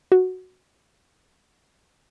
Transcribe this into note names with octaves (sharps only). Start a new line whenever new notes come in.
F#4